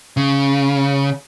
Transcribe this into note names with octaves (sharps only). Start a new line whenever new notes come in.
C#3